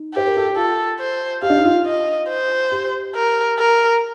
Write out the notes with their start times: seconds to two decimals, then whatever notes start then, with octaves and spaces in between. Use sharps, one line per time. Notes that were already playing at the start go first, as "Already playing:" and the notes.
Already playing: D#4
0.14 G4 C5
0.27 A#4
0.37 A4
0.46 G4
0.56 F4 A4
1.00 C5
1.42 G4 F5
1.50 D4
1.57 D#4
1.64 F4
1.86 D#5
2.29 C5
2.72 G4
3.15 A#4
3.59 A#4